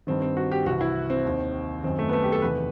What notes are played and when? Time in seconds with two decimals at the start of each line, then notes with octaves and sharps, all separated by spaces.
0.07 G2 D#3 C4
0.22 C4
0.37 F#4
0.52 G4
0.66 C2 C3 E3 F#4
0.81 E4
1.10 C4
1.26 D#2 D#3
1.83 F#2 D#3 C4
1.99 A3
2.09 B3
2.13 A3
2.23 G4
2.32 A4
2.42 E2 C3 D#3 B4